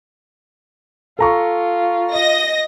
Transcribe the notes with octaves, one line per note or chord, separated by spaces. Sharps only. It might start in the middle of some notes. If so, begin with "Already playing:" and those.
F4 A4 A#5 C#6
D#5 A#6